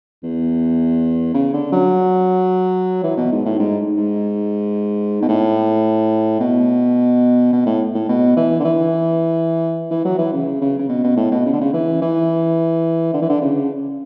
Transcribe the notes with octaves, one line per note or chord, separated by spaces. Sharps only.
E2
C#3
D3
F#3
E3
B2
G#2
A2
G#2
G#2
B2
A2
B2
B2
A2
A2
B2
E3
D3
E3
E3
F#3
E3
C#3
C#3
C#3
B2
B2
A2
B2
C#3
D3
C#3
E3
E3
D3
E3
D3
C#3